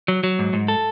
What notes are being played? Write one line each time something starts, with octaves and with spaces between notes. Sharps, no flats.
F#3
F#3
G#2
G#2
A4